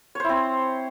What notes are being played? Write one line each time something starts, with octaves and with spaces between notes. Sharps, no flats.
C4 E4 C5 C#5